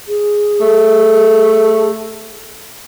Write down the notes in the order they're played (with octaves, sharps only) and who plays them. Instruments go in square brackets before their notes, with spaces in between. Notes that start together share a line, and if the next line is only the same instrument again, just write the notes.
[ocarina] G#4
[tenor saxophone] A3